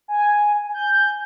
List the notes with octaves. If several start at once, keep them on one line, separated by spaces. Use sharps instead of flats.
G#5
G6